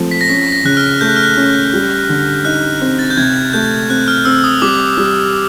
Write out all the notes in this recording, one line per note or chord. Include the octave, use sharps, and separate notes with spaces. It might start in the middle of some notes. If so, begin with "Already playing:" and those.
Already playing: F3 A3 C4
B6
A#6
C#4 B6
A#6
C#3 F#6
F6
A3 G6
F#6
F6
F#6
C#4
G3
D3
D#4 F#6
C4
A6
G6
C3 G#6
A3 G6
C4 F#6
F6
C4 E6
D#6
G3 D6
G3